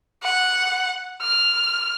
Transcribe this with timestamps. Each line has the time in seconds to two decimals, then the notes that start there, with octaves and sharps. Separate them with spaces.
0.23 F#5
1.21 F6